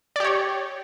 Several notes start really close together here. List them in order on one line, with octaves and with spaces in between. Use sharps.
D5 G4 C#5